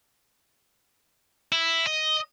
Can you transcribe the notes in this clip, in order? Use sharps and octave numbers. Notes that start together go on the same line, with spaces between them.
E4
D#5